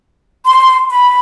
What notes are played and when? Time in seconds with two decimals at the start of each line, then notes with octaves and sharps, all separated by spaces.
0.45 C6
0.90 B5